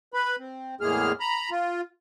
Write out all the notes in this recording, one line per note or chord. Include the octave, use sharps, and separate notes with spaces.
B4 B5
C4
E2 A2 G#3 A#3 G#4 F6
A#5 B5
F4